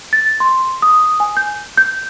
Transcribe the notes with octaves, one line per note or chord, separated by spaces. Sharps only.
A6
C6
D#6
G#5
G6
G6